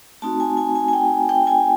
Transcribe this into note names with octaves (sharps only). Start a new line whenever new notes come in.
A3 C4 D#4 F#4 A5
G#5
G#5
G#5
G#5
G5
G5
G#5